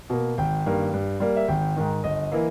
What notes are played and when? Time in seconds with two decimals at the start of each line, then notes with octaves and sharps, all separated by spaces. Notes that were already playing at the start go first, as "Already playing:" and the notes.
0.10 B2 A#3
0.38 G#1 G5
0.66 G2 D#3 A#3
0.93 G2
1.20 G3 A#3
1.36 E5
1.48 G#1 G5
1.76 G#2 D#3
2.04 G1 D#5
2.32 E3 A#3